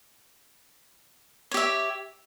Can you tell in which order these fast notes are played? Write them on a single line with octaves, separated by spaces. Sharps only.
C#5 G4 E5